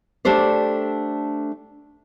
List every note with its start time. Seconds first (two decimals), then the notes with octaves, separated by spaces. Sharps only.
0.25 A3 D4 G4 A4 C5 D5